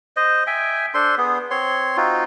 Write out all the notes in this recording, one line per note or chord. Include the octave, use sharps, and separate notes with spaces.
C5 D#5
E5 G5 G#5
D4 A4 C5 C6
B3 G#4
C4 C#5 C6
C4 D#4 F4 F#4